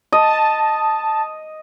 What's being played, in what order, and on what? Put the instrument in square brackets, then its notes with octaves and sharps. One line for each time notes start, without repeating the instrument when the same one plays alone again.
[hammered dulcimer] D#5 [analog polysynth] A5